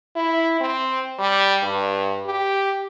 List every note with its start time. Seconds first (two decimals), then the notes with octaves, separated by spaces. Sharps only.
0.16 E4
0.61 C4
1.19 G3
1.63 G2
2.26 G4